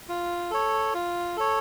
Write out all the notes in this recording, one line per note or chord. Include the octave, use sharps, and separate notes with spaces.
F4
A4 C#5
F4
A4 C#5